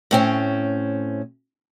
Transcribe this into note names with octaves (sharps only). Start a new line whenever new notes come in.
A2 C4 C#4